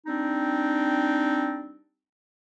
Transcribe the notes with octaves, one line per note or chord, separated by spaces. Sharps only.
G3 C4 D4 D#4